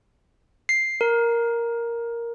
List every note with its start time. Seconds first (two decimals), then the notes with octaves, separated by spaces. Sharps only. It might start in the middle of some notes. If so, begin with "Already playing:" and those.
0.69 C7
1.01 A#4